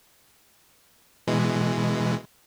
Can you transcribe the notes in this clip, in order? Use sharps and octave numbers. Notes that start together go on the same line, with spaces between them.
B2 E3 G#3